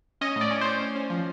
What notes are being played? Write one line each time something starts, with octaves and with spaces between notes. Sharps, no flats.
C#4 D#5
A2
D5
C#4
C#4 C5
C#4
C#4
F3